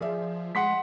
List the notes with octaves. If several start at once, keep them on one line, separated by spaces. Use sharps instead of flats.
F3 G#4 D5 E5
G#3 F#5 C6 B6